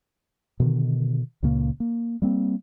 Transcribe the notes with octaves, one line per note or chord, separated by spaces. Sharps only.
B2 D3 D#3
C#2 A#2 C#3 A#3
A#3
G3 A#3 C4